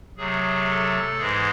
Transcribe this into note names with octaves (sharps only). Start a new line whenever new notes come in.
C3 F#3 A3 G#4
A4
G#2 E3 G#3 G#4